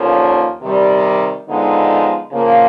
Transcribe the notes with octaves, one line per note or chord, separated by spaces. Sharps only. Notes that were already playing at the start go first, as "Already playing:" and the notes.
Already playing: D#2 D3 F3 A#3 C#4
C3 D#3 G3
D3 F3 G#3 B3 D#4
C#3 F3 A#3